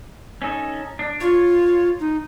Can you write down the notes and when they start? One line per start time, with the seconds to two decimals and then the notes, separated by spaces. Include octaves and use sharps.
0.42 C#4 D#4 A4
0.99 D4
1.21 F4 C#5
2.00 D#4